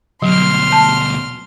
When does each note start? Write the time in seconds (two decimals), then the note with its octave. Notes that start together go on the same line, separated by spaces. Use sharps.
0.22 D2 B2 F#3 C6 F6
0.72 A5